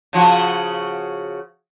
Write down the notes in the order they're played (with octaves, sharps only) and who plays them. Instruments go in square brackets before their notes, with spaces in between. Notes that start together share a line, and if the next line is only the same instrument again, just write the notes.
[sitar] C#3 F3 F#4